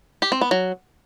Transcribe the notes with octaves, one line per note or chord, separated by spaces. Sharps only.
G4
C4
B3
F#3